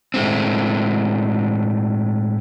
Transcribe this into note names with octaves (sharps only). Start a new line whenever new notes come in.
A2 G#3 A3 C4